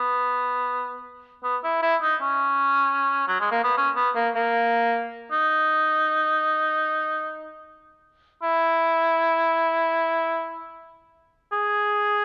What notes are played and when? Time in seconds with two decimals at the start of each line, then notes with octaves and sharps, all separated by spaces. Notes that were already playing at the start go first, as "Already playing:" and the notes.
Already playing: B3
1.43 B3
1.64 E4
1.82 E4
2.02 D#4
2.21 C#4
3.28 F#3
3.40 G#3
3.51 A#3
3.64 B3
3.77 C#4
3.96 B3
4.15 A#3
4.35 A#3
5.31 D#4
8.42 E4
11.52 G#4